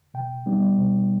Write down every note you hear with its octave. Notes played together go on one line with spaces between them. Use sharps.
B2 G5
G3 B3 D#4
B2